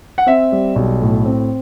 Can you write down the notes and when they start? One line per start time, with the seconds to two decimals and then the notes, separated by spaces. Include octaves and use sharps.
0.18 F#5
0.26 C4 E5
0.52 G3
0.76 B1
1.01 A2
1.25 C4